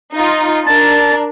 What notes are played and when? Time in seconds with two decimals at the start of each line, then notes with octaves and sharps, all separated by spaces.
0.13 D#4 F4
0.66 D4 A#4 A6